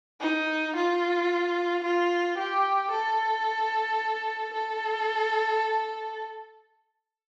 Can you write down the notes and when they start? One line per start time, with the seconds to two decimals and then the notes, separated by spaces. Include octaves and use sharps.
0.20 D#4
0.75 F4
1.83 F4
2.37 G4
2.91 A4
4.53 A4